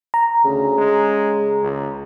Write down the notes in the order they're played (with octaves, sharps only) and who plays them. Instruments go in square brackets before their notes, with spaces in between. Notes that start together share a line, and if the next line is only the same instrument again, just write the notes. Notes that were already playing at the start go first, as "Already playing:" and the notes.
[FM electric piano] A#5
[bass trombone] D2 [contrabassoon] C#3
[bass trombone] G#3
C#2